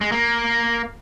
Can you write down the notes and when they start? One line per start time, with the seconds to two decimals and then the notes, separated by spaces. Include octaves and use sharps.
0.01 G#3
0.12 A#3